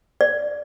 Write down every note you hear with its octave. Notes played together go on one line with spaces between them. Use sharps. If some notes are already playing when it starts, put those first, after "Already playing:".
D5